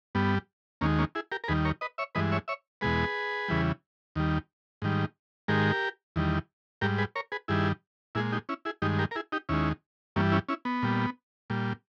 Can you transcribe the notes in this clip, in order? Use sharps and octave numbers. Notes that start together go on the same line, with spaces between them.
G2 G3 B3
D#2 D#3 G#3 A#3 C#4
A#3 C#4
E4 G#4
G4 A#4
A#4
D#2 D#3 G3 G#4 B4
A#4 C#5
B4 D#5
C#5 E5
G2 E3 G#3 B4 D#5
C#5 E5
C#5 E5
E2 B2 G#3 G#4 B4
E2 C#3 E3 G3
D#2 D#3 G3
G#2 D#3 G3
G#2 D#3 G#3 G4 A#4
E2 D#3 G3
G#2 G3 G4 A#4
G#4 B4
A#4 C#5
G#4 B4
G2 D#3 G3 E4 G#4
A#2 G#3 E4 G#4
D#4 G4
C#4 E4
E4 G#4
G2 D#3 G#3 D#4 G4
G4 A#4
A#4
E4 G#4
D#4 G4
D#2 D#3 G#3 C#4 E4
G2 E3 G3 A#3 C#4
C#4 E4
C#4 E4
B3
A#2 G3
A#2 G3